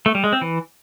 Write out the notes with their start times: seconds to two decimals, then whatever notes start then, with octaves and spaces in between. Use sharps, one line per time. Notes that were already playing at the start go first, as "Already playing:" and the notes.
0.06 A3
0.15 G3
0.24 G#3
0.33 C4
0.41 E3